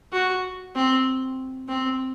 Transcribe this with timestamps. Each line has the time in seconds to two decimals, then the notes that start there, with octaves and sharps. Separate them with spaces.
0.13 F#4
0.75 C4
1.68 C4